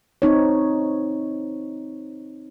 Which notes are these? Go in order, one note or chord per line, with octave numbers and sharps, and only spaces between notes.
C4 D#4 C#5